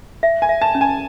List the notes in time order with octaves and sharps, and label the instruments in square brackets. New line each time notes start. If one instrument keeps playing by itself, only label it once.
[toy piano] E5
[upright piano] G#5
[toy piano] E5
[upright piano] A5
[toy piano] C#4
[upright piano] G#5